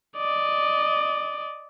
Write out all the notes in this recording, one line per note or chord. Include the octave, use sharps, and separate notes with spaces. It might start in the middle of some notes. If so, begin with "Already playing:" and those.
D5 D#5